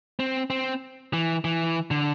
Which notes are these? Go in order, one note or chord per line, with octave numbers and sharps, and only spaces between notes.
C4
C4
E3
E3
D3